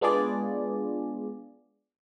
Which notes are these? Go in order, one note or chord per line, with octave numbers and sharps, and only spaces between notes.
G#3 B3 D4 F4 G#4 D5